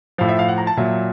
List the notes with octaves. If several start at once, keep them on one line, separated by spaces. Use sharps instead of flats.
A2 F3 F5
E5
F5
F#5
A#5
A5
A#2 F#3 E5